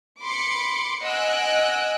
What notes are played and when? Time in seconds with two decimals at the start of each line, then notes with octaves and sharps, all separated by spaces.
0.22 B5 C6 D6 C7 C#7
1.04 D#5 F#5 G#5 E6 F#6 D7